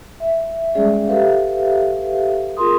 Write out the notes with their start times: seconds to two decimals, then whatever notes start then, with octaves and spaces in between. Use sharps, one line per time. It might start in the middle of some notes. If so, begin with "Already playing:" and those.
0.20 E5
0.75 G3 G#3 C#4 G#4 D5 E5
1.07 G4 A4 B4 E5 F5
2.57 C4 F4 G#4 A#4 C6 D#6